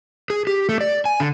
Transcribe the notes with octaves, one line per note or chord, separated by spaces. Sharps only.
G#4
G4
A3
D5
G#5
D3